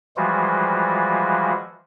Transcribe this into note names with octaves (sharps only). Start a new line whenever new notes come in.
E3 F3 G3 G#3 F4 F#4